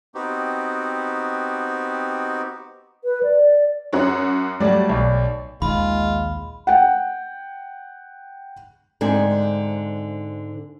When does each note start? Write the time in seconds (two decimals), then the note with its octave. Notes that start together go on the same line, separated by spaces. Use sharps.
0.15 B3 C4 D#4 F#4 G4
3.04 B4
3.23 D5
3.93 F#2 F#4 C#5
4.60 F#3 G3 A3 D5
4.89 B1
5.62 A#1 D#2 D#3 G#3 F4 B5
6.67 F#5 G5
9.01 G#2 D3 C4 G#5